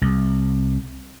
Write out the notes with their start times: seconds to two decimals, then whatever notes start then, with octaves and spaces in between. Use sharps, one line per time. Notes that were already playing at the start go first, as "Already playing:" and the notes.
0.02 C2